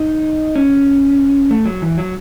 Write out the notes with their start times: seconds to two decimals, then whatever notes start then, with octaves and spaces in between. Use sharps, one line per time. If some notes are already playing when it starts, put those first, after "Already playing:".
Already playing: D#4
0.55 C#4
1.51 A3
1.66 F#3
1.82 E3
1.98 F#3